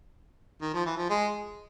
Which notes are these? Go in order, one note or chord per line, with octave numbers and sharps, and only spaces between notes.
D#3
F3
E3
F3
G#3